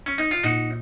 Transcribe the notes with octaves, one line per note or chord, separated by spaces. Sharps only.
C#4
D#4
F4
A#2 D#4 F#4